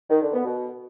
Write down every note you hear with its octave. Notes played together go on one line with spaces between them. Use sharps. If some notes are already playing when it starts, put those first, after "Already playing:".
D#3
D3
B3
B2